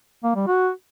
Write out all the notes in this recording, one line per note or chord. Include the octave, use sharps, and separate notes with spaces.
A#3
G3
F#4